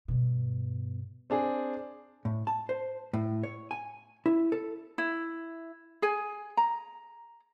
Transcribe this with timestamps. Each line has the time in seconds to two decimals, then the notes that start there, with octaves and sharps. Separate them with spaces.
0.08 G2 B2
1.30 C4 D4 G#4
2.25 A2
2.47 A5
2.69 C5
3.13 A2
3.43 C#5
3.71 G#5
4.26 E4
4.52 A4
4.98 E4
6.02 G#4 G#5
6.57 A#5